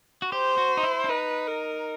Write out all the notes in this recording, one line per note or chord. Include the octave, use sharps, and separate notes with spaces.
F#4
G4 C5
F#4
D#4
E4
D4
D#4 B4
A#4